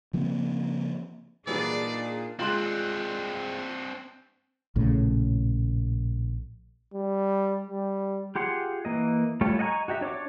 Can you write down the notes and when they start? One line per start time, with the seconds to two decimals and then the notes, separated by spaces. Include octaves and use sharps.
0.13 C#3 F3 A#3 C4
1.47 A#2 E3 F#3 G3 D4 D#4 G#4 D5
2.39 G#3 C4 D4 F4 C6 F#6 F#7
4.76 A#1 A2 C#3
6.94 G3
7.67 G3
8.36 F4 G4 G#4 F#5 C6
8.85 E3 A#3 D#5
9.41 G3 A3 F4 G4 C#5
9.59 D#5 F#5 G#5 A#5 C#6
9.88 F#4 G4 D#5 E5
10.01 D4 C#5 C#6 D6